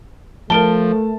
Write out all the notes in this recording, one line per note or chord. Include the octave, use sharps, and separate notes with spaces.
F3 A3 A#4 A5 D7 G7